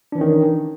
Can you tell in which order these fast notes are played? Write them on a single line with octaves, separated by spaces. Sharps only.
D4 E3 C#4 D#3